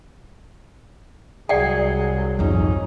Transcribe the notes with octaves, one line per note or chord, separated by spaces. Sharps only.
C2 F#3 G#4 D5 F#5 G5
G#1 F2 C#4 D#4